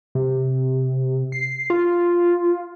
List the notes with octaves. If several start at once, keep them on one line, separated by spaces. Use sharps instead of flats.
C3
C7
F4